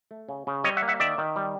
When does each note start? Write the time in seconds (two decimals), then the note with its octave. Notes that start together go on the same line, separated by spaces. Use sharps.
0.11 A3
0.29 C#3
0.47 C#3
0.64 G3 C#5 D#5
0.77 E5 F#5
0.82 A#3
0.88 E5 F#5
1.00 D#3 D5 E5
1.18 D#3
1.36 G3